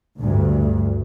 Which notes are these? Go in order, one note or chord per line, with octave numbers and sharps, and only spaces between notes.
D2 G2